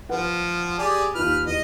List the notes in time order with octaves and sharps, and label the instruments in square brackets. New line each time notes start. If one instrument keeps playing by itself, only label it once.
[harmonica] F3 [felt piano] B4 F#5
[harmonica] G4 G#4 D5
[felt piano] D#2 F4 [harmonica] B4 F6
[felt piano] E2 [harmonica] D#5